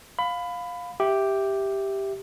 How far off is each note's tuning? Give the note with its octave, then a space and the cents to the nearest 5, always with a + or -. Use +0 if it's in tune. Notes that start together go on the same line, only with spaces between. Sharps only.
F5 +15 B5 +20
G4 +0 E5 +0